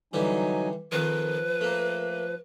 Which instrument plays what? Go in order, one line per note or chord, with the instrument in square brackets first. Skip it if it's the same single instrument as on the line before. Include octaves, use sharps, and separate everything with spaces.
[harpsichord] D3 E3 G3 [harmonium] F#3 D#4 G#5
[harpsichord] F2 D#3 [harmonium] F3 [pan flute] B4
[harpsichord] A3 A#3